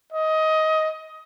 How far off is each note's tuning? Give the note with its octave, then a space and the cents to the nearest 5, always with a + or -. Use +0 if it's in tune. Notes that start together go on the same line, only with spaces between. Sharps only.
D#5 +20